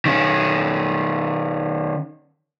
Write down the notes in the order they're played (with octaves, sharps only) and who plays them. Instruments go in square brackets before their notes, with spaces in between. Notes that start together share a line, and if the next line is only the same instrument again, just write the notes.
[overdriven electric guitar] D#3 C#4